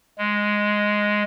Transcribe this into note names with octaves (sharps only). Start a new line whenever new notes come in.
G#3